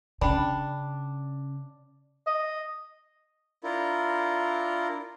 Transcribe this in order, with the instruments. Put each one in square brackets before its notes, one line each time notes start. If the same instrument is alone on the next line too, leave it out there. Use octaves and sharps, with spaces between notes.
[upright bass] C#3 [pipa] D4 [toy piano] G5 B5
[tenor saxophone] D#5
[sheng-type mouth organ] D4 E4 F4 A#4